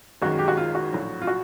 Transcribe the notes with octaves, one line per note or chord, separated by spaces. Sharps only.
G#1 F#2 D#3 G#3 F#4
G4
F#4
F4
F#4
A#1 A2 F#3
F4
F#4